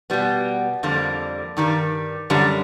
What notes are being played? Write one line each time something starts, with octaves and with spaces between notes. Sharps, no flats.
B2 G3 B3
F2 D3 G3 A#3
G2 D#3 G3
F#2 D3 G3